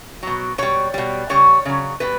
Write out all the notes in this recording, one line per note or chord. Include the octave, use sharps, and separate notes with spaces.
B2 F#3
B2 G3 C#5
B2 G3
C#3 G3 C#5
C#3 F#3
B2 G3 B4